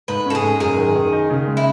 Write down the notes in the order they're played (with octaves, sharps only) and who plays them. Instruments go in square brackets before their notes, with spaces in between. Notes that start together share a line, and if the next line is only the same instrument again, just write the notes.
[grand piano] G#2 [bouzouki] B4
[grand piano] C#4 [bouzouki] A4
[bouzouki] G#4
[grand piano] G#2
[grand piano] F#2 [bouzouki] G#4
[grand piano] D#3
D#3
D#4
C#3
G#3
[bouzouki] E4